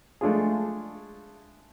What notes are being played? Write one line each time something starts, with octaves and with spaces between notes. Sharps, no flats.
G#3 A3 D4 F4 G#4